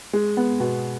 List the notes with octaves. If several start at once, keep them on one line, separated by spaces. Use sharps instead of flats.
G#3
B3
B2